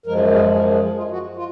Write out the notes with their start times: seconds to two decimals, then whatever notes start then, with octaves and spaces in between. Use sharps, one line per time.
0.06 F#2 F3 G#3 A#4
0.33 G#4
0.51 G#4
0.58 A#4
0.71 G#4
0.84 G#4
0.98 F4
1.11 F#4
1.37 F4